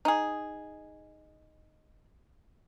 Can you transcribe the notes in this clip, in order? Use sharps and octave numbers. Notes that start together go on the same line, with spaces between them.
D#4 G#4